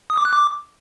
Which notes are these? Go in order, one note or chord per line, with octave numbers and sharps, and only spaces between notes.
D#6
D6
F#6
D6